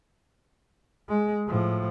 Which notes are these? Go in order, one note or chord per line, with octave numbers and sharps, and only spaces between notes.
G#3
A2 F3